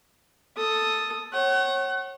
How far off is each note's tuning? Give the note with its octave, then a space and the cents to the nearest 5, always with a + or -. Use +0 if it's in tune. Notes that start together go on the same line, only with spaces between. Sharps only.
A4 +0 D#6 +0
C#5 -25 F#5 +35